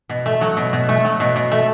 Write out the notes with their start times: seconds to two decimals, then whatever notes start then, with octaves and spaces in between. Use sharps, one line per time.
0.10 B2
0.26 A3
0.41 F#3
0.57 B2
0.73 B2
0.89 A3
1.04 F#3
1.20 B2
1.36 B2
1.51 A3